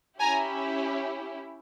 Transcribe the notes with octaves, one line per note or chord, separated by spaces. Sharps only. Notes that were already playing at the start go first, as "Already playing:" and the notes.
C#4 E4 G4 G#5 A#5